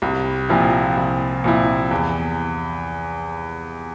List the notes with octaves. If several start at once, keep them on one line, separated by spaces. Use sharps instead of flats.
C2
A#2 F3 C4 E4
C2
A#2 F3 C4 E4
E2